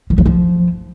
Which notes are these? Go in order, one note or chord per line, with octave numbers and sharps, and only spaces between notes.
F3
E3
F3